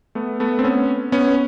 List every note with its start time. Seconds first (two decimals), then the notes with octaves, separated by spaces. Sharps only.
0.15 A3 B3
0.40 A3 B3
0.59 C4
0.64 B3 C#4
1.12 B3 C#4